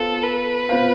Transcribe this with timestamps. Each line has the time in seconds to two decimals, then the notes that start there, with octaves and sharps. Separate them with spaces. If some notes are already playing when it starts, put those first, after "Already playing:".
Already playing: B3 F4 A4 C5 F5
0.23 B4
0.69 B3 F4 C5 F5